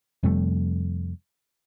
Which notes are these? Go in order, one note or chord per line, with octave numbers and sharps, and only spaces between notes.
F2 C3 G3 A3